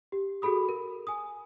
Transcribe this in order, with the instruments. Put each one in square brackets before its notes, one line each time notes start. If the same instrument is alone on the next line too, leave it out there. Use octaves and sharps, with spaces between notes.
[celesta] G4
F#4 G#4 A4 B5 D#6
A#4
G#5 D#6